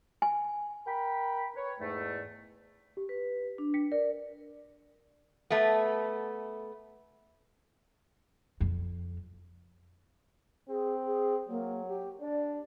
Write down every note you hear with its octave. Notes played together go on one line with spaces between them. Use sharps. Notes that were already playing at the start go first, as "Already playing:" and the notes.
G#5
A#4 G5 B5
B4 C#5
E2 G#2 A3
G4
B4
D4
G5 B6 C#7
A#4 D5
A3 B3
F2
C4 G#4
G#4
F#3 A#3
G4
D4 D5